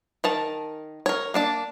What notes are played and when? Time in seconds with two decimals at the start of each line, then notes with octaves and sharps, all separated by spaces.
0.24 D#3 A#4 A5
1.06 A#4 C#5
1.34 A#3 D4 A5